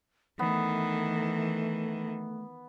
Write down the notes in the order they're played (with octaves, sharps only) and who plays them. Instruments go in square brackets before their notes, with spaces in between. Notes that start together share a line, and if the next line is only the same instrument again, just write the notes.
[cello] D#3 E3 [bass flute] A3 [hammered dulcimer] B3